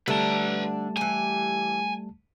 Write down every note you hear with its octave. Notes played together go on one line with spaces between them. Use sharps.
D3 G3 A3 D4 B4 A5 A#5
E3 G4 G#5